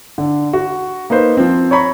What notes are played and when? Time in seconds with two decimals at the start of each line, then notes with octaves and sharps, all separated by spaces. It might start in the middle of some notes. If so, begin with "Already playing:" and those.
0.18 D3
0.53 F#4
1.10 A#3 D#4 B4 C5
1.37 F3 C4
1.71 C#5 A#5 B5 C#6